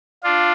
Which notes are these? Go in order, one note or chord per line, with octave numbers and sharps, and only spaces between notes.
D4 F4